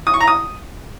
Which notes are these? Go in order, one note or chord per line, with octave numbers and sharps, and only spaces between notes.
D#6
C#6
A#5
D#6